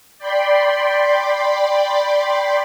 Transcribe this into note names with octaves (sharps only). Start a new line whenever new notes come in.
D5 G5 B5 C6